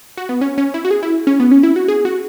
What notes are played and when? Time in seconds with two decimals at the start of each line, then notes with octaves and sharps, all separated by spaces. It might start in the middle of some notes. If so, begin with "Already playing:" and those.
0.17 F#4
0.29 B3
0.41 C#4
0.58 C#4
0.74 E4
0.85 F#4
0.91 G#4
1.03 E4
1.27 C#4
1.40 B3
1.52 C#4
1.63 E4
1.76 F#4
1.88 G#4
2.05 F#4